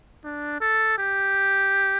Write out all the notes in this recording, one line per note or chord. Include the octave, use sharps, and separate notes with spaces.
D4
A4
G4